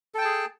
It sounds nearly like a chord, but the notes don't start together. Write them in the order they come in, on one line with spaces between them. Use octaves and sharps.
A4 G5 A5 G#4